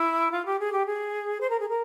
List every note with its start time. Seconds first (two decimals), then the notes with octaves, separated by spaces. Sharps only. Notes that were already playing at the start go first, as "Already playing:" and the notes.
Already playing: E4
0.32 F4
0.46 G4
0.59 G#4
0.72 G4
0.86 G#4
1.41 C5
1.50 A#4
1.60 G#4
1.69 A#4